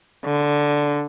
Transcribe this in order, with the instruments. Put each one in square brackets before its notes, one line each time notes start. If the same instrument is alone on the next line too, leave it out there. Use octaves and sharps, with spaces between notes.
[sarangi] D3